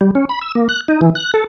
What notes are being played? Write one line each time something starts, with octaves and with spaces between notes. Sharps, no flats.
G3
C#4
B5
E6
A#3
F#6
D#4
E3
F#6
A4